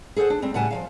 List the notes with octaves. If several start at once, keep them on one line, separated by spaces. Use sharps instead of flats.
G#4 A4 B4 C5 F#5
D4
G3 C4
A2 C#3 G3 F#5 G#5 A5
F3 F#3 F5